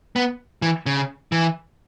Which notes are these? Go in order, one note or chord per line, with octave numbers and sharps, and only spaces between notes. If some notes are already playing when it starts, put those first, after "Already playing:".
B3
E3
C#3
E3